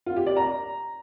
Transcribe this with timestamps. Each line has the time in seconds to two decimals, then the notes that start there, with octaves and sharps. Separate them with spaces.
0.06 F4
0.16 G4
0.26 D5
0.37 A#5